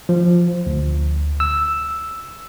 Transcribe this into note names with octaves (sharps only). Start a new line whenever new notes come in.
F3
D2
E6